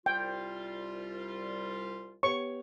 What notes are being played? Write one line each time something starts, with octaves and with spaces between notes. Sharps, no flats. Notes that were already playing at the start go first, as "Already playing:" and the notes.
C2 G3 F4 G5
B3 G4 C#5 C#6